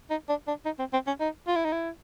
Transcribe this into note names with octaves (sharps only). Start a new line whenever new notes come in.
D#4
D4
D4
D#4
C4
C4
C#4
D#4
F4
E4
D#4
E4